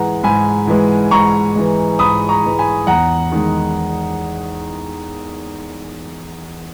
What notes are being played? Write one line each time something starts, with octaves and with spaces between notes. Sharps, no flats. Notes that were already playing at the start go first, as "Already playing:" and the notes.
Already playing: G#2 E3 G#3 F#5 A#5
G#2 G#5 B5
E3 G#3
G#2 A#5 C#6
E3 G#3
G#2 B5 D#6
A#5 C#6
E3 G#3
G#5 B5
E2 F#5 A#5
D#3 G#3